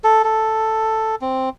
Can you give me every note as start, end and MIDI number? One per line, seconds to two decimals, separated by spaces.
0.04 0.22 69
0.24 1.16 69
1.21 1.49 60